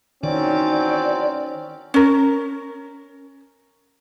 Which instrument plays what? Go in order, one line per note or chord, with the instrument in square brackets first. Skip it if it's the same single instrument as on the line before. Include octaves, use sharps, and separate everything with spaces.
[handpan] D#3 [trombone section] E3 F#3 C4 [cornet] C#4 [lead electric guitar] D5
[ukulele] C#4 A#4